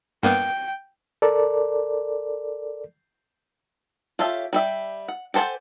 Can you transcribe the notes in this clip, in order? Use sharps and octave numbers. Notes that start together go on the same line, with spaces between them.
G2 A#3 B3 G5
A4 A#4 D5
F4 G4 A4 C#5 E5
G3 G4 E5
F#5
G4 A4 C5 F#5 G#5